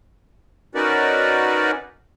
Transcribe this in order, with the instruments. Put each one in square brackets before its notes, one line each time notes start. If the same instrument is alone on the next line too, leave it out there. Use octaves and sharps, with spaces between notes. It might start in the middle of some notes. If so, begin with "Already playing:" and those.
[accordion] C#4 D#4 F#4 A#4 B4 D5